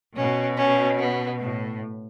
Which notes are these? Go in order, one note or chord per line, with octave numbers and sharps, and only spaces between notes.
B2 C#4
C#4
B3
A2